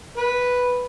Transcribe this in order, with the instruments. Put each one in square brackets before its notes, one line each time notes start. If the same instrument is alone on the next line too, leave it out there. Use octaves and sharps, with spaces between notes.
[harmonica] B4